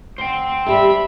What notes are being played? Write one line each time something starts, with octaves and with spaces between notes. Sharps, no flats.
D2 C5 G5
G3 G4 A4 E5 B5